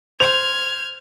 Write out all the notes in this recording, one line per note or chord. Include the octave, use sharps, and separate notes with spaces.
C5 F6 G#6 F7